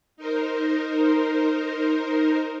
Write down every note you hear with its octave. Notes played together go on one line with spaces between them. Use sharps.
D#4 A#4 C5